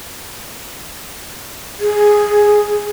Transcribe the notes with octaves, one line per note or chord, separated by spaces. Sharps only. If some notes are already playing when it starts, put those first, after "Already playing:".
G#4